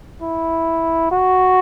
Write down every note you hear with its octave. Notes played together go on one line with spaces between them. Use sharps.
E4
F#4